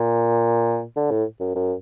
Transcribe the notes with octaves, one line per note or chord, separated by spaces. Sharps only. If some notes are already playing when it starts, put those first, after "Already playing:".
Already playing: A#2
D3
A2
F#2
F#2